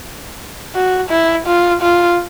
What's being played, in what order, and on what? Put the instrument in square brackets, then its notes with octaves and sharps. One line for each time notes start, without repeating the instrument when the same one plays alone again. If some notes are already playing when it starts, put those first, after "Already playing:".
[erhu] F#4
E4
F4
F4